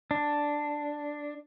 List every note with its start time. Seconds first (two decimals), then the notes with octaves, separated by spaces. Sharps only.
0.11 D4